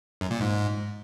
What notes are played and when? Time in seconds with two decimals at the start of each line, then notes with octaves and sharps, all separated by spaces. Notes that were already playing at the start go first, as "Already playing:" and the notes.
0.21 F#2
0.31 A#2
0.40 G#2